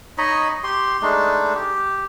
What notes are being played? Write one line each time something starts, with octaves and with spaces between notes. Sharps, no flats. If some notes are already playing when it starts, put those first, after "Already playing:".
D#4 C#5 D#5 B5
G4 C6
G#3 A3 D4 D#4
G4